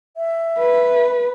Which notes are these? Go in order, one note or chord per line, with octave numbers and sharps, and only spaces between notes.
E5
B4